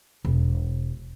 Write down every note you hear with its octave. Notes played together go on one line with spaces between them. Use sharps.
E1